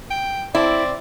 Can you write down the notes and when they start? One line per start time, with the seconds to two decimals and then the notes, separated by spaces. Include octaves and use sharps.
0.10 G5
0.55 C4 E4 D5